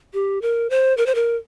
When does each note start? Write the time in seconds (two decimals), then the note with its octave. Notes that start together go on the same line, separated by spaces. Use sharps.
0.13 G4
0.42 A#4
0.70 C5
0.97 A#4
1.06 C5
1.15 A#4